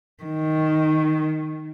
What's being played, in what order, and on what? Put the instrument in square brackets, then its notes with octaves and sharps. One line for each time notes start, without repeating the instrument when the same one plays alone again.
[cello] D#3